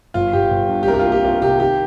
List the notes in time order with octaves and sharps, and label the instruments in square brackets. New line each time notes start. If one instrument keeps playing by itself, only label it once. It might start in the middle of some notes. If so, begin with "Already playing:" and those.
[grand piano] G1 F4
G1 G4
G1
G2
G4
C2 A#4
G4
F4
A#3
G4
C2 F4
C3 G4
D#3 G4